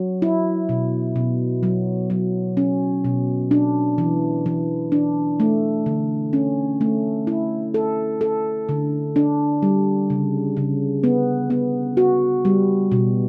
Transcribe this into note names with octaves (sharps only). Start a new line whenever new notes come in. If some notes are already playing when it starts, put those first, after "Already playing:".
Already playing: F#3
E4
B2
B2
F#3
F#3
C#4
B2
D4
E3
E3
D4
A3
D3
C#4
A3
E4
A4
A4
D3
D4
G3
C#3
C#3
B3
B3
F#4
G3
B2